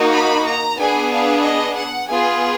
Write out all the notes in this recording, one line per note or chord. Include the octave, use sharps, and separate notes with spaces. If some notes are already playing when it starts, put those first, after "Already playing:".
Already playing: A#3 D#4 F#4
B5
A#5
B3 D4 G#4 G#5
F5
D#5
F#5
B3 F4 G#4 G#5